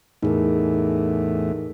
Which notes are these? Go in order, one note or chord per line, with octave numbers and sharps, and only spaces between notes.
E2 A2 D#4 G#4 A#4